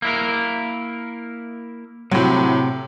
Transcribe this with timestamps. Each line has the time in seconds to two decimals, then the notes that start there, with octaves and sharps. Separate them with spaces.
0.02 A#3 E4 A#4
2.11 A2 C3 F#3